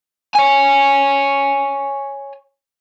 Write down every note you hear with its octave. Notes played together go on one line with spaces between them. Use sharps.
C#5 G#5